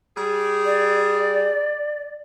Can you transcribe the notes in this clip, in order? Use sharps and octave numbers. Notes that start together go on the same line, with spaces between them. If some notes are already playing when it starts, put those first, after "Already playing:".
G3 G#4
D5